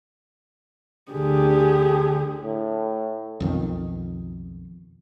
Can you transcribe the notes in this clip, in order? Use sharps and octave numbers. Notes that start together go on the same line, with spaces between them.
D2 D3 G4 G#4
A2
B1 F2 D#3